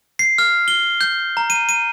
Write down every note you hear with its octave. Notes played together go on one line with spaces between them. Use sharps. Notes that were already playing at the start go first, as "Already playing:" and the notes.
C7
F6
G7
G6
A#5
D#7
D#7